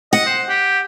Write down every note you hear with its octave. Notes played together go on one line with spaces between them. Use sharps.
D#5 F#5
C5
G4